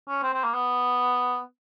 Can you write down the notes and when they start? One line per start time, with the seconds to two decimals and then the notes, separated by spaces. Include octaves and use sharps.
0.08 C#4
0.23 C4
0.33 C4
0.44 A#3
0.54 B3